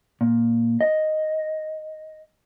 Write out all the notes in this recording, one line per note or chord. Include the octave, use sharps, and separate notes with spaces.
A#2
D#5